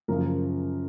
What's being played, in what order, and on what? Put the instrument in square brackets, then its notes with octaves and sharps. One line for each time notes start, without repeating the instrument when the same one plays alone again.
[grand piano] F#2 C#3 F3 A#4